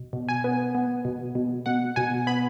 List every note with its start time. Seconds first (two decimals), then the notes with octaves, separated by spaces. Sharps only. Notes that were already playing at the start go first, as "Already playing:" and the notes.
Already playing: B2
0.13 B2
0.29 G#5
0.44 B3
0.75 B3
1.05 B2
1.35 B2
1.66 B2 F#5
1.96 B2 G#5
2.27 B3 B5